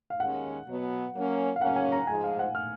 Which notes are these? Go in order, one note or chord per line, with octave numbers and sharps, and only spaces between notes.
F5
D#2 D#3 G#3 C#4 F#5
B2 F#3 B3
F#3 A#3 C#4
F5
C#3 F#3 A#3 C#4 F#5
G#5
A#5
G#2 F3 G#3 G#5
F5
F#5
F6